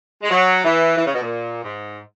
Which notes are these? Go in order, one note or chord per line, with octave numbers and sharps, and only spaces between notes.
G#3
F#3
E3
E3
C#3
B2
A#2
G#2